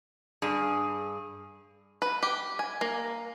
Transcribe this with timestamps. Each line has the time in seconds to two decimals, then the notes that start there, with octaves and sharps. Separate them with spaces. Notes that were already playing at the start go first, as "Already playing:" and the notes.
0.42 G2 G#4
2.02 B4
2.23 G4
2.59 G#5
2.81 A#3